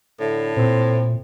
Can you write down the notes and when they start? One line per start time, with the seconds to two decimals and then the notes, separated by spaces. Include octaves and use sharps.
0.20 A2 D3
0.56 A#2 C4